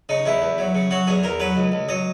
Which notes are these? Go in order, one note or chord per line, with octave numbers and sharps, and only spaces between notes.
C#3 D#4
E2 E4
E2
F#3
C#3
F#3 F#4
E2 G#4
E2 A#4
F#3 B4
C#2
C#2
F#3 D#5